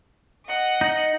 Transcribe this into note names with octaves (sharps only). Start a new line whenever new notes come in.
D#5 F#5
D#4